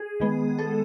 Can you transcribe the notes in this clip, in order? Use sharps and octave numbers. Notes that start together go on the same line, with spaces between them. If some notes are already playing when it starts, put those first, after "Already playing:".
Already playing: G#4
D#3 G#3 B3
A4